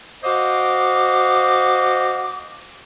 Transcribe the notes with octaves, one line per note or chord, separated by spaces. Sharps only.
F#4 C5 D#5 F5 D6